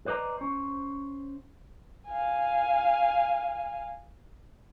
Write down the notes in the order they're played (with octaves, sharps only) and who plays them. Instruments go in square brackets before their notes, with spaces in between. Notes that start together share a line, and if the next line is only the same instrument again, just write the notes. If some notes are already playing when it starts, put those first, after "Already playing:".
[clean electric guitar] B4 C5 D5 D#5 A#5
C#4 C5
[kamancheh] F5 G#5